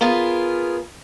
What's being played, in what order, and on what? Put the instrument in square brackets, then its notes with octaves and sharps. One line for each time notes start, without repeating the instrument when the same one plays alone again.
[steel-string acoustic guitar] B3 F4 G#4 A#4